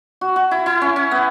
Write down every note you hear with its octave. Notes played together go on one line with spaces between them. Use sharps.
F#4
F#4
E4
E4
C#4
C#4
B3